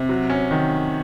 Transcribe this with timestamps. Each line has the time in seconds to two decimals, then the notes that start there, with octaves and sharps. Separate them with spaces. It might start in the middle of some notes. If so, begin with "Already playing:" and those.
Already playing: C3
0.09 F#3
0.30 C#4
0.51 D#3